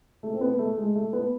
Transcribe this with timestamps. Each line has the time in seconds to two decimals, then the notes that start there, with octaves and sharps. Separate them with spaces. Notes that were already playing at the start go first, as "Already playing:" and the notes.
0.23 A3
0.34 C4
0.41 B3
0.59 A3
0.78 G#3
0.95 A3
1.13 B3